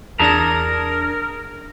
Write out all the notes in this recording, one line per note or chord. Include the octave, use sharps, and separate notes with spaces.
E2 D4 G#4 A#4 A5 A#5 A#6